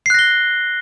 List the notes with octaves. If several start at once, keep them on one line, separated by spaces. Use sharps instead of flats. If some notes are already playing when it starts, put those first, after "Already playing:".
F#6 A#6 C7 G7